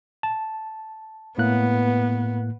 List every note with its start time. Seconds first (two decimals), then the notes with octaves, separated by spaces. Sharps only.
0.23 A5
1.38 A2 A#3 B3 F#6